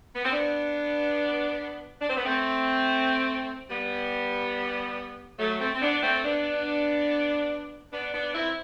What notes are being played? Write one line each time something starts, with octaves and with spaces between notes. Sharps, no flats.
B3
C4
B3 D4
D4
C4
B3
A3 C4
G3 B3
F#3 A3
A3 C4
C4
B3 D4
A3 C4
B3 D4
B3 D4
B3 D4
C4 E4